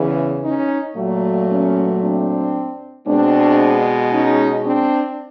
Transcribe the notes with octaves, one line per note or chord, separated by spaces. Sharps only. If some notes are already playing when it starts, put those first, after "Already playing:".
Already playing: E2 C#3 E3
C#4 D#4
A#2 F#3 A3
B3 C#4
C4 D4
B2 G#3 B3 C4 D4
C#4 D#4
C4 D4